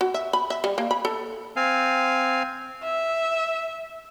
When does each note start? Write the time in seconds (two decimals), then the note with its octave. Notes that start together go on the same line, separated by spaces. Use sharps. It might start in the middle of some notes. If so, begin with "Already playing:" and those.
0.01 F#4
0.14 E5
0.33 B5
0.50 E5
0.64 G3
0.78 A#3
0.91 B5
1.05 A4
1.56 C4 F5 G#5
2.84 E5